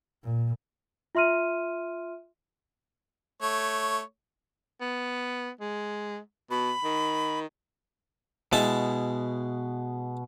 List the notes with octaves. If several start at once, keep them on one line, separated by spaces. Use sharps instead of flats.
A#2
F4 E5 C6 F6 D#7
A3 C#5
B3
G#3
B2 B5
D#3
B2 G#3 E4 A5